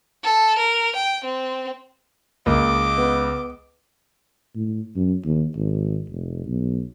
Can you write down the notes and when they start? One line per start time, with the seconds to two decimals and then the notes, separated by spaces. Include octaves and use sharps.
0.24 A4
0.59 A#4
0.96 G5
1.25 C4
2.46 C#2 A#3 D#5 D6
2.98 B3
4.55 A2
4.96 F#2
5.24 D#2
5.56 G#1
6.10 F1
6.46 B1